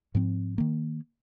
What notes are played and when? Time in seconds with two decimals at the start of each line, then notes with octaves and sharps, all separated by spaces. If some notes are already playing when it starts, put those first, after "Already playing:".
0.15 G#2 F3 C4
0.58 D#3 A#3